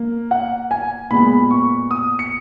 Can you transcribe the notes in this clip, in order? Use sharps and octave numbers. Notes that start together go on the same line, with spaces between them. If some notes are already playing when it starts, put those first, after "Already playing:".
Already playing: A#3
F#5
G#5
A#2 G#3 B3 B5
C#6
D#6
C#7